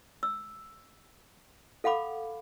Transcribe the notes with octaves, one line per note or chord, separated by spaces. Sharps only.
E6
A4 F5 F#5 B5 D6